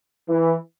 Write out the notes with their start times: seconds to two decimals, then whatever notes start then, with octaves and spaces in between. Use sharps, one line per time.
0.28 E3